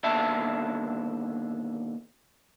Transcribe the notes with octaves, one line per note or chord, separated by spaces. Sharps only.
D#2 B2 D3 E5 A5